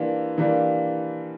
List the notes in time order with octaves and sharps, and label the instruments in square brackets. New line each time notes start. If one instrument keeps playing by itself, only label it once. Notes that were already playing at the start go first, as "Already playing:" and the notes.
Already playing: [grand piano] E3 G3 A#3 D4 F4
E3 G3 A#3 D4 F4